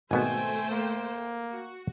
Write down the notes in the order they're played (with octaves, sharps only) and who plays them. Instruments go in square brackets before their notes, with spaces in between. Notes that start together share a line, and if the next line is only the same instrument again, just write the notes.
[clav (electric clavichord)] G#1 B2 B3 [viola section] A3 C5 G5 [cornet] G#5
[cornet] A#3
[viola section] F#4